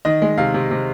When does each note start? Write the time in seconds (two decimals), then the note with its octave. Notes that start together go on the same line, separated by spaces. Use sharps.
0.05 D#3 D#5
0.22 G#3
0.38 C3 F5
0.54 C3
0.71 C3